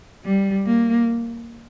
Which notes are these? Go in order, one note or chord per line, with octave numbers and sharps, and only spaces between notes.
G3
A#3